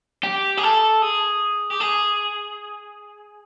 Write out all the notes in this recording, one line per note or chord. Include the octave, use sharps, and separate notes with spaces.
G4
G#4
A4
G#4
G4
G#4